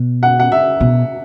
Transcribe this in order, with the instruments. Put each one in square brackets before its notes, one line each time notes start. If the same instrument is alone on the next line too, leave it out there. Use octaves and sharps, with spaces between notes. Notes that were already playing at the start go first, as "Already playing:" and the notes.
Already playing: [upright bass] B2
[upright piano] F#5
F#5
E5
[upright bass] B2